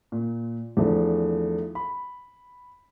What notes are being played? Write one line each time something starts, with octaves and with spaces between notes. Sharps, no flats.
A#2
E2 D#3 F3 A3 D4
B5